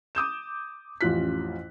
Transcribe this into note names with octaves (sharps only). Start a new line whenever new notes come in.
D6 D#6 G6 E7
A1 F2 C#4 F4 F#6 B6